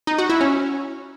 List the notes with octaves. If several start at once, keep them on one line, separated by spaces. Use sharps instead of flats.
D#4
F#4
E4
C#4